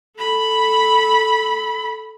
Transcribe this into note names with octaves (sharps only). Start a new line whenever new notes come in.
A4 B5